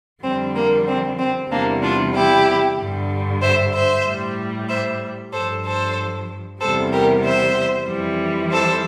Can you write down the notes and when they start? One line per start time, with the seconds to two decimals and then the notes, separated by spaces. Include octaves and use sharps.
0.23 F2 D3 G3 C4
0.56 A#3
0.88 C4
1.19 C4
1.51 E2 C3 G3 A#3 D4
1.82 D4 F4
2.14 E4 G4
2.79 G2 D3 G3
3.41 C5 E5
3.73 C5 E5
4.05 A2 G3
4.69 C5 E5
5.33 G2 F3 A4 C5
5.65 A4 C5
6.60 E2 C3 G3 A4 C5
6.93 G4 A#4
7.24 C5 E5
7.88 F2 E3 G3
8.51 A4 C5